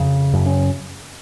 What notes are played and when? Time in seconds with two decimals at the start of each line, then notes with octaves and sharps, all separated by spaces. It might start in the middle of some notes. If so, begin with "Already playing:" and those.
Already playing: F2 C#3
0.33 F#2
0.46 C#4